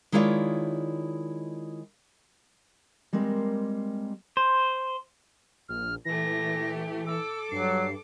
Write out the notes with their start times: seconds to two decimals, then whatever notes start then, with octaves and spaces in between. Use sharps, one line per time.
0.12 D#3 G#3 E4 F4 C#5 D5
3.13 G3 G#3 A#3 C4 A#4
4.37 C5
5.69 A#1 F6
6.05 A#2 E3 A3 G4 A#6
7.07 A4 D6 E6
7.52 G2 F#3 C7